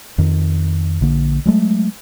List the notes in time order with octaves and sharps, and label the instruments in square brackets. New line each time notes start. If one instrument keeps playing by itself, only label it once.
[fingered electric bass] F2 D#3
A#1 D3 A#3
F#3 G#3 A3